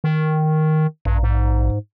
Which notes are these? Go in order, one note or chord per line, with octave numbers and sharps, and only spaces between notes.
D#3
A#1 G2
G#2